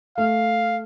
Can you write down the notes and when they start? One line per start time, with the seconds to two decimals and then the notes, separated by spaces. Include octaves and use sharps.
0.18 A3 F5